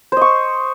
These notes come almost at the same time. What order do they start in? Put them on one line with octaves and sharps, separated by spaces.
C5 D#5 C#6